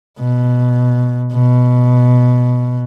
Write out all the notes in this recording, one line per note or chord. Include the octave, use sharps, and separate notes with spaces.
B2
B2